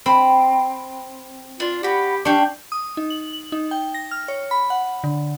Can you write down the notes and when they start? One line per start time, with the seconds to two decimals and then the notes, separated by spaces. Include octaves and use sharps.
0.06 C4 B5
1.60 D4 F4
1.83 F#4 G4 B5
2.25 D4 G4 F5 C#6
2.72 D#6
2.97 D#4
3.10 F#7
3.33 F#7
3.52 D#4
3.71 G5
3.94 A#6
4.11 F6
4.28 C#5
4.51 B5
4.70 F#5
5.04 D3